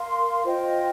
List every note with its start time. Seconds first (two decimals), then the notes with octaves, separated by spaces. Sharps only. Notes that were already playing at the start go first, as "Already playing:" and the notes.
Already playing: A#4 F5 C6
0.44 F4 C5 D#5 G5